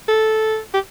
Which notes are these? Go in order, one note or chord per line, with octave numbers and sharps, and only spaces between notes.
A4
G4